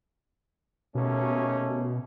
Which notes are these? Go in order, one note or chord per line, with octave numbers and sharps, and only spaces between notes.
D#2 B2 A3 C#4